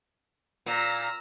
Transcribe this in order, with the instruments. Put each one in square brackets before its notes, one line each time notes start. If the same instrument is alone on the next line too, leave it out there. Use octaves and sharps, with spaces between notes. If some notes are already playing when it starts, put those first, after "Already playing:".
[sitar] A#2 [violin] A#5 E6